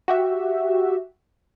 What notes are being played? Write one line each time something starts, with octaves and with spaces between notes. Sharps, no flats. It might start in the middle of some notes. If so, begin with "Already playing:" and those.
F#4 G4 E5